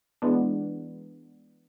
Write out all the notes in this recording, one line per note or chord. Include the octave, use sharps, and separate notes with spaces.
E3 G#3 B3 D4